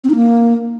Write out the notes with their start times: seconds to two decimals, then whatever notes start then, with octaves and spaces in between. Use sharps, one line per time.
0.04 C4
0.10 D#4
0.15 A#3